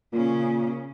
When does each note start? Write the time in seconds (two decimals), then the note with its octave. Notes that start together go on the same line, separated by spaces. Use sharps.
0.13 A#2 C#3 C#4